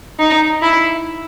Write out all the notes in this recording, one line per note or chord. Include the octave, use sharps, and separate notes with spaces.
D#4
E4